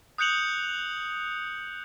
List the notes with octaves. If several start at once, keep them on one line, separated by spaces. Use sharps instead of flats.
D#6 F#6 G6 C#7 F7 F#7